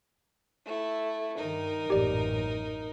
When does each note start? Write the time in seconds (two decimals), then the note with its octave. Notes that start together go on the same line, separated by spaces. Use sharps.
0.65 A3 E4
1.37 G2 D#3 D#4 A#4
1.90 A1 F#2 A#2 G4 D5